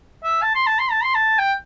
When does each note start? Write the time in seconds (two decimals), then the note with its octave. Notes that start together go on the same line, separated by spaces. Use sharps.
0.24 E5
0.43 A5
0.55 C6
0.67 A5
0.79 C6
0.91 A5
1.03 C6
1.15 A5
1.39 G5